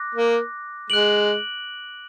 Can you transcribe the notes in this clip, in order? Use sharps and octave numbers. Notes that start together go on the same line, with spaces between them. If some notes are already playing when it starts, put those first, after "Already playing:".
Already playing: D6 F#6 A#6
A#3
G#3 F#6 D7 F#7